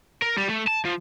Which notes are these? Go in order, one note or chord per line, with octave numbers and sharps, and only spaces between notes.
A#4
G3
A3
A5
F3